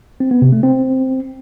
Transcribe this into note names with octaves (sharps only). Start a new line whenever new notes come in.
C4
B3
C3
A3
C4